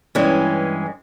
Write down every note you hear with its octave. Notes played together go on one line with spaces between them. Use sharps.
G2 E3 G#3 C#4